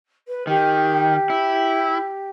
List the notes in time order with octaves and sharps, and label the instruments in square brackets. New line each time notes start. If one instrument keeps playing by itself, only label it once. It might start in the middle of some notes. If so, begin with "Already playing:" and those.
[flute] B4
[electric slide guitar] D#3 [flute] G4
[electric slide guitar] E4